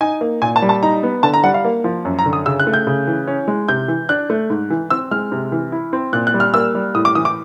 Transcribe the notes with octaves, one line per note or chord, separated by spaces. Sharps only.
D#4 G#5
A#3
A#2 G#5
A5
G3
A5
D#4 A#5
B3
D3 A5
A#5
G3 F#5
F5
A#3
F3
F#2
A#5
D3
D#6
C#3 E6
F#6
A3
G6
C#3
E3
C#4
G#3
C3 G6
E3
D4 F#6
A3
G#2
E3
C4 E6
G#3 F6
C3
E3
E4
C4
A#2 F#6
F#6
G3
F6
A#3 E6
G3
A2 D#6
D6
E3 D#6
D6